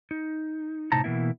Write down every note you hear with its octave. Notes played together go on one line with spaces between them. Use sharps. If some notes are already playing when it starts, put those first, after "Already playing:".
D#4
A2 C3 D#4 A5 A#5
B2 E3 A#3 B3 E4